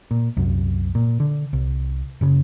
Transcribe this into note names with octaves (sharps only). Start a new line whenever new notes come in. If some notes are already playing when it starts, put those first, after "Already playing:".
A#2
C2 F#2
A#2
D3
C2
F#1 C#3